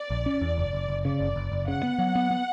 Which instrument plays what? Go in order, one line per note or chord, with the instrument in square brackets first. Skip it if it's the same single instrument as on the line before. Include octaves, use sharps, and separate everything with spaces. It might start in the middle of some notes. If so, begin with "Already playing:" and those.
Already playing: [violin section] D5
[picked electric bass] A#1
C#4
E2
F#1
F#1
F#1
[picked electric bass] C#3 [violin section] D5
[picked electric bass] F#1
F#1
F#1
[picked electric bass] C#3 [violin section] F#5
[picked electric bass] B3
F#3
B3
B3